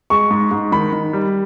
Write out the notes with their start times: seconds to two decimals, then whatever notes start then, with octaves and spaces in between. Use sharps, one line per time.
0.10 G#3 C#6
0.30 G#2
0.51 G#2
0.72 D#3 B5
0.93 D#3
1.13 G3